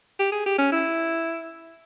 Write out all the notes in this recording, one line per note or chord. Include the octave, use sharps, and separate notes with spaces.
G4
G#4
G4
C#4
E4